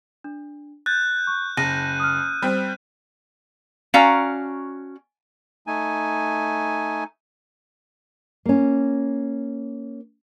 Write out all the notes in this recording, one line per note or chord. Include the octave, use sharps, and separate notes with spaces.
D4
F#6 G6 A6
C#6
F#1 A#6 D#7
D#6 F6
G3 C4
C#4 F#4 D5 F5 A#5
A3 D#4 G#5
A#3 C#4